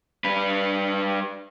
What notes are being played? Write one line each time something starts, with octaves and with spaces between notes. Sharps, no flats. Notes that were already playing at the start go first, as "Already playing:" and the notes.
G3 B4